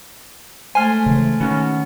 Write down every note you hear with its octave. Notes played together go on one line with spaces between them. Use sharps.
G#3 A3 C5 G#5 F6
C#3 E3
D#3 B3 C#4 F#4